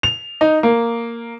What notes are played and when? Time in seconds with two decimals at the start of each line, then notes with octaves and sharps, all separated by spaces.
0.03 F7
0.41 D#4
0.63 A#3